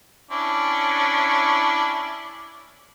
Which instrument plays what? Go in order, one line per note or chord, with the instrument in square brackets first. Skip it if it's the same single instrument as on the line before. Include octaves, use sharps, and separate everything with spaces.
[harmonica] C#4 D4 E4